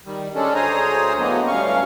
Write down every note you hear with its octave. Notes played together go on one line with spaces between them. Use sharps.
D#3 G3
D3 G#3 C#4 D4 A4
D2 G#4 C5 C#5 A#5 D#6
A2 D3 F#3 G#3 A#3 B3
D2 G2 C#4 F5 C#6